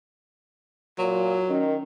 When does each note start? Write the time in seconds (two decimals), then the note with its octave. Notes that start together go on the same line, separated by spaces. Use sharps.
0.99 A#2 F#3
1.49 D#3 C#4 A#4